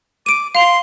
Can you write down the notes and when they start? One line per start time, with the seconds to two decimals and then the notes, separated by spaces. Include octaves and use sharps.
0.26 D6 D7 D#7
0.55 F5 C6 F7